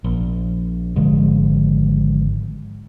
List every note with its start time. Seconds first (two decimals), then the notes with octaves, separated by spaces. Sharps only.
0.04 A#1
0.96 G#1 D3 F3 G#3